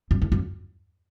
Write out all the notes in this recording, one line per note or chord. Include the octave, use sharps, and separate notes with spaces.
F#2
E2
F#2